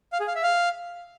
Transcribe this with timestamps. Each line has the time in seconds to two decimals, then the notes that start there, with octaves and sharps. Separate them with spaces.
0.12 F5
0.20 G#4
0.28 F5
0.35 E5
0.43 F5